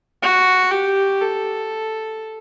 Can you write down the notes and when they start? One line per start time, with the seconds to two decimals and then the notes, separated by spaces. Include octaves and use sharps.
0.23 F#4
0.71 G4
1.21 A4